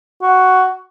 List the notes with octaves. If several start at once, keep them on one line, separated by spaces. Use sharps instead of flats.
F#4